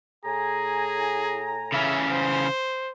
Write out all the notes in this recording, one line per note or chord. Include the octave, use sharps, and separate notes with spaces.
A2 G#4 G#5 A#5
C#3 E3 C#4 E5
C5